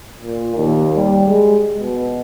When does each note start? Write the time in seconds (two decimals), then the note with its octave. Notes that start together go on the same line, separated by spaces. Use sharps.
0.19 A#2
0.56 D#2
0.96 G3
1.27 G#3
1.79 B2